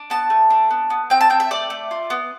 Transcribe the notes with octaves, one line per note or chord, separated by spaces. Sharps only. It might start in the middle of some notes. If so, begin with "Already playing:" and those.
Already playing: D4
B3 A5
A3
D4
B3
B3
C4 G5
A5
C4 G5
E5
A3 D5
A3
F4
B3